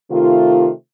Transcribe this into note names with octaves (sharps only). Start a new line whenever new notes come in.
C3 D#3 A3 F4